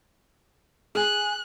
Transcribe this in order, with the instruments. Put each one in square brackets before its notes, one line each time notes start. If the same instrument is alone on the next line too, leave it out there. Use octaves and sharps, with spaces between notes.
[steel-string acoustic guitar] G#4 G#5 [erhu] F#6